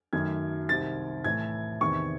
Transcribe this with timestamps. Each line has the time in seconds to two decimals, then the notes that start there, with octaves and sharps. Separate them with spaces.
0.13 F#2 D#3 F#3 A3 G#6
0.69 C2 C3 D#3 A6
1.24 A2 E3 A3 G#6
1.81 E2 C3 D#3 C#6